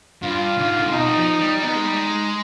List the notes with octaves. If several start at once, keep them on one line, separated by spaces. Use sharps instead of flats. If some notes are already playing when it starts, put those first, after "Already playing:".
G2 F4
G#2
D3
C3
B2 D#4
G3
F3
G3
B3 D#4
G#3
G3
G#3